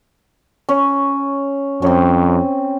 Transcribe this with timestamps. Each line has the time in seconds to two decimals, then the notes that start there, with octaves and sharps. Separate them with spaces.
0.69 C#4
1.82 F2 C4 C#4